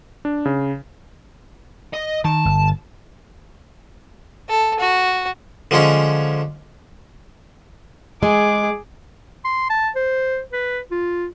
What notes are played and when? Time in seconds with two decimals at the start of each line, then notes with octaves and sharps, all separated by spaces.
0.25 D4
0.45 C#3
1.93 D#5
2.25 D#3 A5
2.45 G1
4.49 A4
4.80 F#4
5.71 D3 F3 G#3 C#4
8.23 G#3 G#4 D6
9.45 C6
9.70 A5
9.96 C5
10.53 B4
10.91 F4